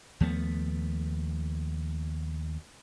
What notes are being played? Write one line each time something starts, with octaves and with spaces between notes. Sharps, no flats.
D#2 F3 A3 B3